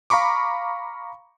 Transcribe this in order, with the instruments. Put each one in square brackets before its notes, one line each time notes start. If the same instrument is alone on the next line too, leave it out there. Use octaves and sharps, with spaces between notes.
[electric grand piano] F5 A#5 B5 C#6 D6